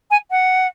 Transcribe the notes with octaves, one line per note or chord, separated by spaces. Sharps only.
G#5
F#5